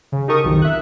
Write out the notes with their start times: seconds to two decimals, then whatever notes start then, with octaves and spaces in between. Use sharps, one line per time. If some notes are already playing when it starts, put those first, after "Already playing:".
0.12 C#3
0.28 D#4 G4 A4 A#4 C#6 D#6
0.44 B1 F2 D#3
0.62 E5 F#6